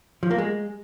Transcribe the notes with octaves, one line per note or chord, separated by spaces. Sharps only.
F3
A#3
G#3